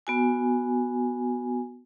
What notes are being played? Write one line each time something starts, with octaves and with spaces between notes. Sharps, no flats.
B3 F#4 G#5